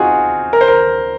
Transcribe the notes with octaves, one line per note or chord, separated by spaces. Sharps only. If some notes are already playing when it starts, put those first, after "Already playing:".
Already playing: C4 D#4 F4 F#4 G#4
A#4
C5
A#4